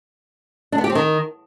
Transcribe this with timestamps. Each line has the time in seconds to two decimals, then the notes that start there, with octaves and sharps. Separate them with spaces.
0.72 D4
0.78 B3
0.84 G4
0.90 C4
0.95 D#3